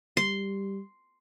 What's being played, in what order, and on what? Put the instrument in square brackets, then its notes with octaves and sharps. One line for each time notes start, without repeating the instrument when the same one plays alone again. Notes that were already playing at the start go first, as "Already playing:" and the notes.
[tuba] G3 [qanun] C6